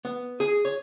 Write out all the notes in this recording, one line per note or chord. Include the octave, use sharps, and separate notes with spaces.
B3
G#4
C#5